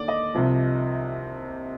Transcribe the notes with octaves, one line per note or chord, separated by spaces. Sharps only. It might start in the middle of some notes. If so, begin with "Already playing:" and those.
Already playing: D#2 D3 D5
D#5
C2 C3 F3